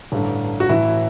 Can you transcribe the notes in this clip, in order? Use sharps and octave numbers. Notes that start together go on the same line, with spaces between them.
A1 G2 D3
F#4
A1 A2 E3 E4